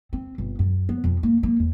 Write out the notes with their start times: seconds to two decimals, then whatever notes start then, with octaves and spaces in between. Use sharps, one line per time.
0.13 C4
0.38 G1
0.59 F#2
0.89 B3
1.04 F2
1.23 A#3
1.43 A#3
1.60 E2